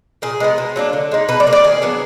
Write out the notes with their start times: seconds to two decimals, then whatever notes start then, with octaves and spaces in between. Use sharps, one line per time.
0.22 A#2 G#4
0.40 G#3 B3 D#4
0.58 B2
0.76 F#3 A#3 D4
0.93 D3
1.12 G#3 D#4
1.28 B2 B4
1.40 D5
1.47 A#3 D4
1.53 D5
1.64 D#3 G#4
1.82 F#3 B3 D4